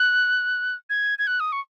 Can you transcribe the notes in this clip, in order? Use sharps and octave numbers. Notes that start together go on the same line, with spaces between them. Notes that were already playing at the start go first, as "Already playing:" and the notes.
Already playing: F#6
G#6
G#6
F#6
D#6
C#6